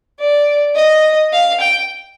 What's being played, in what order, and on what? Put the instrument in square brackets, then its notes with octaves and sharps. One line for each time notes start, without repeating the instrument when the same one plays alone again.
[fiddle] D5
D#5
F5
G5